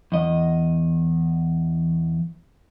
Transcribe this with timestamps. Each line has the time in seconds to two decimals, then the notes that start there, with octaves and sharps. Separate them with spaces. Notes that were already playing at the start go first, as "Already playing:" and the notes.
0.12 E2 D#5